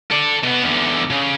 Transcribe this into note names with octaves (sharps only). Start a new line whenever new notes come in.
A4 D5
B2 B3
E2 D3
C#3